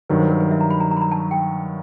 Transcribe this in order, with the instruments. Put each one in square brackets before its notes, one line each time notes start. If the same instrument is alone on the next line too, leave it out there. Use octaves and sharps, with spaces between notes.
[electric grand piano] G2 D#3 F#3 [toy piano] B4
[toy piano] C5
A#4
B4
E5
A#5
B5
A#5
A#5
B5
A#5
A5
G5